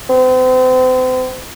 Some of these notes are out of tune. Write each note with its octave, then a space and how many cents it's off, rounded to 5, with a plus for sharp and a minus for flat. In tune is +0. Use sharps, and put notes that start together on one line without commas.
C4 -40